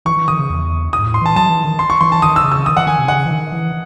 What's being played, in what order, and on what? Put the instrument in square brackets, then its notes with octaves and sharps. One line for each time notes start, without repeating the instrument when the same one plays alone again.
[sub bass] E3 [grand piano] C#6
[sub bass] E3
[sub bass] D#3 [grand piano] D#6
[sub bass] C#3
E2
[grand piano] D#6
[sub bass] G#2
A2
[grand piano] C6
[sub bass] E3 [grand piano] A5
[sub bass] F#3 [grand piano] A5
[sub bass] E3
D#3
[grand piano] C6
C#6
[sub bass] E3 [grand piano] C6
[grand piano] A5
[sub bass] D#3 [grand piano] D#6
[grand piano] E6
[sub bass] C#3
[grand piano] E6
[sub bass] D#3 [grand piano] D#6
[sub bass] E3 [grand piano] F#5
[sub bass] D#3 [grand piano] G#5
[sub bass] C3
[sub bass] C#3 [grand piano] F#5
[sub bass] E3
D#3
E3